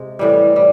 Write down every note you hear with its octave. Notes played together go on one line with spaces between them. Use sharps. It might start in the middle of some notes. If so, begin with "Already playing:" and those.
Already playing: C3 G#3
A2 E3 G3
G3